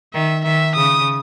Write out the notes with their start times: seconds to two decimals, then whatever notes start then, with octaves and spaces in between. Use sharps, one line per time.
0.14 D#3 E5
0.45 D#3 E5
0.75 C#3 D#6